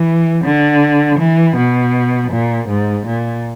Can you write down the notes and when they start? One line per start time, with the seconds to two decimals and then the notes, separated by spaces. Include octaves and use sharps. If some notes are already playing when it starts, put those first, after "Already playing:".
Already playing: E3
0.44 D3
1.19 E3
1.56 B2
2.31 A#2
2.68 G#2
3.06 A#2